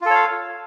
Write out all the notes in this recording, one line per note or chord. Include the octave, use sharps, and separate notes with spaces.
F4 A4 C#5 F5